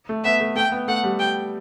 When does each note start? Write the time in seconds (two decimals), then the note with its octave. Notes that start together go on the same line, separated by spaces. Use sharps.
0.09 A3
0.24 B3 E5
0.40 A3
0.56 A3 G5
0.72 B3
0.88 A3 F#5
1.04 G3
1.19 G5